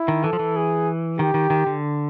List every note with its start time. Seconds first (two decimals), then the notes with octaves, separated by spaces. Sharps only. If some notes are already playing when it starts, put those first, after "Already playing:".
Already playing: E4
0.08 D#3
0.24 E3 A4
0.33 F3
0.39 E3
0.56 G#4
1.19 D#3 G4
1.34 D#3
1.50 D#3
1.66 D3